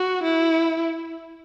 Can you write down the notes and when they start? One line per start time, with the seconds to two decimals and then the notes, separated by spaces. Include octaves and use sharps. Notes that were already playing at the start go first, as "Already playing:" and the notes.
Already playing: F#4
0.23 E4